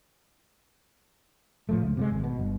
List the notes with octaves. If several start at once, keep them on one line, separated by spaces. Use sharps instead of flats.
A2 F3 A3
C#2
C3 F3 G#3
G#1
B2
G1